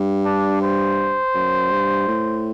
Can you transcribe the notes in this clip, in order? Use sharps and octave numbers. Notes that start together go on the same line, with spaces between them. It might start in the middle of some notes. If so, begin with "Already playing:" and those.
Already playing: G2
D4
C5
F#2
G2
A2